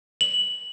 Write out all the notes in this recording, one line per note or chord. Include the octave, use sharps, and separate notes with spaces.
F#7